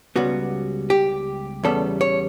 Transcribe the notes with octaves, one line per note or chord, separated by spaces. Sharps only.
C#2 C#3 G3 B3 F#4
G4
E2 C#3 G3 B3 A4
C#5